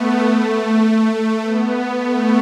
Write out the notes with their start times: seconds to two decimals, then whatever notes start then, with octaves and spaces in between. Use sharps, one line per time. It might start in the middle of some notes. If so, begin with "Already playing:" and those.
Already playing: A3 B3
0.25 A3
1.41 B3
1.99 A3